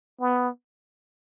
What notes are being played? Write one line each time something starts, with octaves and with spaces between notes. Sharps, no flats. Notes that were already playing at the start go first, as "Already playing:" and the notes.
B3